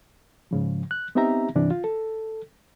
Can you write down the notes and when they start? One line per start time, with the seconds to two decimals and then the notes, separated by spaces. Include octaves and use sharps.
0.51 G#2 C#3 F3
0.91 F#6
1.15 B3 C4 D#4 G4 E5 A#5
1.55 G2 C3 E3 D4
1.71 F4
1.84 A4